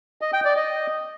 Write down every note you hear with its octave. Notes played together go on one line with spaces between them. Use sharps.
D#5
G5
D5
D#5